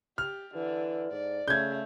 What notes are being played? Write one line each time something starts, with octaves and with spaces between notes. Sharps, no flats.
G4 F6
D3 E3
G#2 D5
C#3 A3 G6 G#6